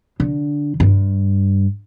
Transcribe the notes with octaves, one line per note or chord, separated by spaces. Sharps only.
D3
G2